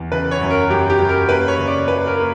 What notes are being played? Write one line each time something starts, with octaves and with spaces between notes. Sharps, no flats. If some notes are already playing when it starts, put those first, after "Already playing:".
Already playing: E2
C#3 B4
C#5
F#2
A#4
F#2 G4
G4
F#2
A#4
A#3 B4
C#5
C#3
D5
A#3 B4
A#4
A#3